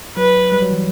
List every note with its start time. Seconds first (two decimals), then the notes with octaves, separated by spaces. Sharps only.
0.16 F#3 B4
0.52 G3
0.62 F#3
0.71 E3